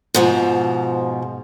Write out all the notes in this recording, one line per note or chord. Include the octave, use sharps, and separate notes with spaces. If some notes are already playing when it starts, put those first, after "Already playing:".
G#2 B2 F3